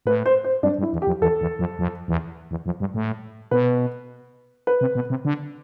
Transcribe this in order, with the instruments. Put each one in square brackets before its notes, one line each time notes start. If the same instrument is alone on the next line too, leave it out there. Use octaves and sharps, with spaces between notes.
[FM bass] A2 [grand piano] B4
[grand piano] C5
C5
[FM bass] G2 [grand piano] D4
[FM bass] G2
[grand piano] E4
[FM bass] E2
[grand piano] G4
[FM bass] F2
[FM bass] E2 [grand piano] A4
[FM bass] E2
F2
F2
E2
E2
F2
G2
A2
[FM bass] B2 [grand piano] B4
[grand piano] B4
[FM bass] C3
B2
C3
D3